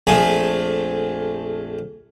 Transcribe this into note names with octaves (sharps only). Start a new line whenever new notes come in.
A#1 F2 A3 G#4 G#5